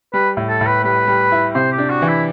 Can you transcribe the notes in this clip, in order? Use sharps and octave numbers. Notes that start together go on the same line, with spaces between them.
G3 B4
A2
A4
A2
B4
G3 B4
G3
E4
C3 C5
G4
D4
F#4
E3
E4